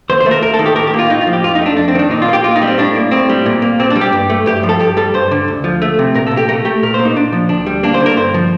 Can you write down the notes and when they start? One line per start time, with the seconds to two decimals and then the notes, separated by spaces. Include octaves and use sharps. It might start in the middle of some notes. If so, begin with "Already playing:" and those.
0.10 D#2 C5
0.20 C5
0.26 A3
0.31 A#4
0.43 D#2 A#4
0.54 A4
0.59 D#3
0.66 G4
0.76 A2 A#4
0.87 G4
0.94 A#3
0.99 F4
1.10 A2 D#4
1.21 F4
1.27 F3
1.33 G4
1.44 F2 F4
1.55 D#4
1.61 A3 D4
1.77 F2 D4
1.88 C4
1.95 D#3 D4
2.11 A#2 D#4
2.22 F4
2.28 A#3 G4
2.44 A#2 F4
2.56 D#4
2.62 G3
2.67 C4
2.78 A2 D4
2.96 A#3
3.11 A2 C4
3.29 G3
3.46 A#2
3.62 A#3
3.80 A#2 C4
3.90 D4
3.96 G3
4.01 G4
4.13 G2
4.30 A3
4.46 G2 G4
4.63 F3
4.69 A4
4.80 G2 G4
4.97 G3 A4
5.14 G2 C5
5.31 D3
5.48 D2
5.64 F3
5.82 A3
5.99 C3
6.15 A#2 A#4
6.27 A#2 A4
6.37 G4
6.49 A3 A#4
6.65 A3 G4
6.83 A#2 A#4
6.94 C5
6.99 A#3
7.05 D#4
7.16 A#2 D4
7.33 F3
7.49 D2 D4
7.66 G3
7.83 A#3 D4
7.94 C5
8.00 D3
8.06 A#4
8.17 G2 C5
8.34 F3